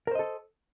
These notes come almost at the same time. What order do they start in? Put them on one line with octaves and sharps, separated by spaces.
A#4 C5 D#5 A4